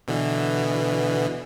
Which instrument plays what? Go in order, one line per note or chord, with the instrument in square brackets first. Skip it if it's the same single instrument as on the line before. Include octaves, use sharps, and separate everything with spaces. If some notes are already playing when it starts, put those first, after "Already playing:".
[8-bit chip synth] B2 D3 E3